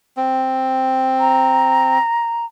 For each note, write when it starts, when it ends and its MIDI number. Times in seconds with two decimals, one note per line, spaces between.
0.17 1.98 60
1.20 2.45 82